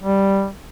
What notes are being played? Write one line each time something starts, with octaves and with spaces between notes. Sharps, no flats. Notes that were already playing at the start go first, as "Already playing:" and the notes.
G3